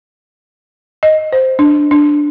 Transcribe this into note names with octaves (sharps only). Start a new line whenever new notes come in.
D#5
C5
D4
D4